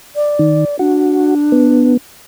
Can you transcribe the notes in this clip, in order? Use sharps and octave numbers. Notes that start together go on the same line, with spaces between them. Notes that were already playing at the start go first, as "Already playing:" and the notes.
D5
D#3
D4 F#4
B3